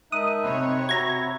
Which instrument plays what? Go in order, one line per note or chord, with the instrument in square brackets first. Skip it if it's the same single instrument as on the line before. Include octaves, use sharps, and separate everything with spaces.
[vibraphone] G#3 A#4 A5 [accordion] D#4 E5 F#6 [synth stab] D#6
[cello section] C3 C#5 [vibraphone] G5 B5 C6
[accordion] F#4 E5 F#5 [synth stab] A#5 G#6